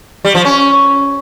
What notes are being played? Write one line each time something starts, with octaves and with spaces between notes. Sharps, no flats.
G3
F3
C#4